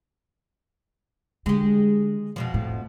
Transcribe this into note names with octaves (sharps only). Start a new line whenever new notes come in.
D3 G#3 G4
F2 B2 F3
A2